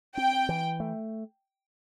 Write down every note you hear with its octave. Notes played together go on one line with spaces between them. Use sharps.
C4 G5
E3
A3